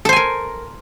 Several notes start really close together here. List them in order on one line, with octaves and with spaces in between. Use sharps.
A4 C5 G#5 A#4